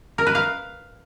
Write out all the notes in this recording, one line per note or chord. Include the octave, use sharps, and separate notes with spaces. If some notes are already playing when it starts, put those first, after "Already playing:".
A#4
B4
F5